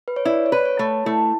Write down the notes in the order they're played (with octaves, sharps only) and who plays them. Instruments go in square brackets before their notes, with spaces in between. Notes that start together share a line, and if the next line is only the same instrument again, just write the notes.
[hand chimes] B4
C#5
[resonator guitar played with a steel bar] E4 [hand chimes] D5
[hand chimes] C#5
[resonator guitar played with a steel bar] B4
[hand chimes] C#5
[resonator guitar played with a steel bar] A3
[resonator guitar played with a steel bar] A3 [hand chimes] E4